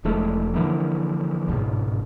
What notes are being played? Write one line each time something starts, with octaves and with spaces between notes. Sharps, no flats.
E1 F3 G#3 A3
D3 E3 F3 A#3
G1 C#2 G#2 B2